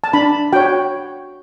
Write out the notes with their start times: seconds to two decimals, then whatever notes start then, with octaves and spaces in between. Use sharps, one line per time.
0.04 A5
0.13 D4 B5
0.53 F#4 C#5 G5